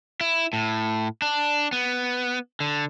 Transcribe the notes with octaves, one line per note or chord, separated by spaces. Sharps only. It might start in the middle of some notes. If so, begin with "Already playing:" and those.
E4
A2
D4
B3
D3